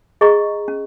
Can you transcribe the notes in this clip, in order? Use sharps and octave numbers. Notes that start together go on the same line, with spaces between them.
G#4 D#5 A#5 C#6
C#4